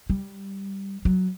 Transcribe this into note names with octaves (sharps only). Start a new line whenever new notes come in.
G3
F#3